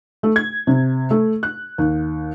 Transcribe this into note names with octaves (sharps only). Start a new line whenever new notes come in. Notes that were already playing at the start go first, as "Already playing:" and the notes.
A3
G#6
C3
A3
F#6
D#2